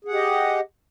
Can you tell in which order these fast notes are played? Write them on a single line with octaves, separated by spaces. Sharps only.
G#4 F#5 G4 D#5